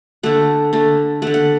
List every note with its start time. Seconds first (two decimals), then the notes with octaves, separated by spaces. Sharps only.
0.23 D3 A3 F#5
0.73 D3 A3
1.22 D3 A3 F#5
1.34 F#5